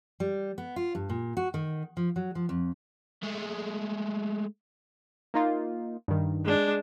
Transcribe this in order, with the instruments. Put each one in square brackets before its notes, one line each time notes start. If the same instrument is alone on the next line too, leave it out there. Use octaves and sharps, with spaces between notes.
[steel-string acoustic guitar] G3
B3
F4
G2
A#2
F#4
D#3
F3
F#3
F3
F2
[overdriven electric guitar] G#3 A3
[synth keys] A#3 D#4 F4
G2 D#3
[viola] G#3 D4